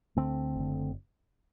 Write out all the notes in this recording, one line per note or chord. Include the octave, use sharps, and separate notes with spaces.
D2 D3 A3 C4
F#1 D3